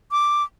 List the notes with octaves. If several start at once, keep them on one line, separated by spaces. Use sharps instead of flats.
D6